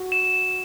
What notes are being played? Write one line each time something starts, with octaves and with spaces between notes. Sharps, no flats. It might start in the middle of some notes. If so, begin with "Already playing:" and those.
Already playing: F#4
E7